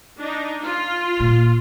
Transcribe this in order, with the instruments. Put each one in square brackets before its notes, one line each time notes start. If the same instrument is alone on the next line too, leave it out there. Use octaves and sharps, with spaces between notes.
[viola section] D4 D#4
F4
[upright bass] A#2